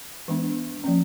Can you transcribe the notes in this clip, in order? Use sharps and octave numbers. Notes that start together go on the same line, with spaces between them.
E3 G#3 B3 D4
F3 A#3 C#4